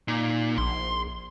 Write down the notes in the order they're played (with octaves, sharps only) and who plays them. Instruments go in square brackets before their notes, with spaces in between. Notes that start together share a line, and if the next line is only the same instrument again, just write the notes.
[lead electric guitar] A#2 [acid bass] D#4
[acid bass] A#1 [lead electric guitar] C6